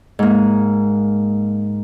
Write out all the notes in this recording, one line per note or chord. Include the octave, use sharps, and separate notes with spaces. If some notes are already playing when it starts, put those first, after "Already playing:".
G#2 A#3